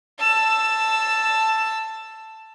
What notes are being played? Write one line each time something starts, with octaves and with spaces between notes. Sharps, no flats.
A5 E6